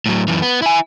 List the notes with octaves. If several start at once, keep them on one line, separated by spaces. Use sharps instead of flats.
A2 F#3
F#2 E3
B3
E4 G#5